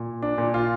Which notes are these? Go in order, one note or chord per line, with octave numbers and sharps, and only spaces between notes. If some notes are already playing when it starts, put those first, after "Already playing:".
Already playing: A#2
D4
A#2
F4